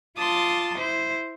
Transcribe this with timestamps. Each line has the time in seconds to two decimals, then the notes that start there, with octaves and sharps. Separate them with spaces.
0.17 F4 A5 C6 D6 D#6
0.78 E4 C5